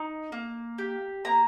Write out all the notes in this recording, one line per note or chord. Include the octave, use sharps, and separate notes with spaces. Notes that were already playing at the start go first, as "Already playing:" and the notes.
Already playing: D#4
A#3
G4
A#3 A#5